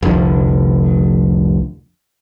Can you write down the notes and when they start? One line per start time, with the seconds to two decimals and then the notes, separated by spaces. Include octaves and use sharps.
0.03 F1 C2 D3 F3